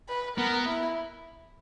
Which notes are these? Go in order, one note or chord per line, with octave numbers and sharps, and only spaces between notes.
B4
B3 A#4
E4